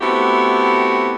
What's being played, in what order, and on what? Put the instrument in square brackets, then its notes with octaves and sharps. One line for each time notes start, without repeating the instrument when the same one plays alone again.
[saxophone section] A3 B3 C4 E4 F#4 G4